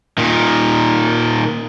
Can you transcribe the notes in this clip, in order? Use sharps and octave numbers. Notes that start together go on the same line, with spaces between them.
A#2 D#3